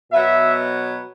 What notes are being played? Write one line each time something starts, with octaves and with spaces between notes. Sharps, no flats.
B2 F#3 B3 E5